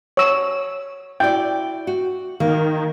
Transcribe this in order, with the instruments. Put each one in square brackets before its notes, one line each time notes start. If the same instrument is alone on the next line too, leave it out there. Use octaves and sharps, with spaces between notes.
[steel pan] C#5 E6
[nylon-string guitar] E4 F#4 D5 [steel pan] G5
[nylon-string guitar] F#4
[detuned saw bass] D#3 [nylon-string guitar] A#3